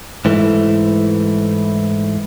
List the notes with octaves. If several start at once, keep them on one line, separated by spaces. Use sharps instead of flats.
G#2 E3 A3